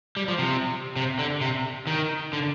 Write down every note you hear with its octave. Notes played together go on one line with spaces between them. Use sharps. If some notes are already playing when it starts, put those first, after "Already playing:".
G3
F3
C3
C3
D3
C3
D#3
D3